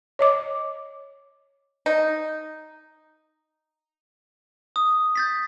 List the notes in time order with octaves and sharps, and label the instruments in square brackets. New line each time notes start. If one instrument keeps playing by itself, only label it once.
[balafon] C#5 D#5 D6
[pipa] D#4
[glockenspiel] D#6
G6 A6 B6